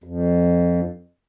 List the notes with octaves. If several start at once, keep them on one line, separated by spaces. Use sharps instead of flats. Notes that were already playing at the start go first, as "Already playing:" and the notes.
F2